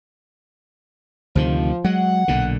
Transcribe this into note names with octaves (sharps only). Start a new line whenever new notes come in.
D2 C3 D#3 F3
F#3 G#3 F#5
B1 A#2 D3